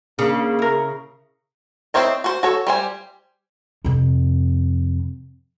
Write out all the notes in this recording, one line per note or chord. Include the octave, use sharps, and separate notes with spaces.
C#3 A#3 D4
E4 A#4
C4 E4 C5 C#5 D#5
F#4 C5
F#4 A4 C#5
G3 C5 G#5
F2 C3